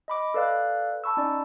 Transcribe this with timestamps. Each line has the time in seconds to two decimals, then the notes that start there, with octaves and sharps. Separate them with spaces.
0.08 D#5 B5 D6
0.34 A4 B4 D5 F5 F#6
1.04 A5 B5 C#6 E6
1.17 C#4 D#4 D5